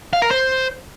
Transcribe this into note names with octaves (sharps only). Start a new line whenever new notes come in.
F5
A#4
C5